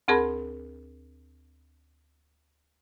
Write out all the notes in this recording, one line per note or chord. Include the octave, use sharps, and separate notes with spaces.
D2 C4 G#4 A#4 A5 B5